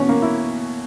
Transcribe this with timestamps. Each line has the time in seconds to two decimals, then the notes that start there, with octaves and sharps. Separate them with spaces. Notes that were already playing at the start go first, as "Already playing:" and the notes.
Already playing: B2 E3 C#4
0.09 A#3
0.22 E4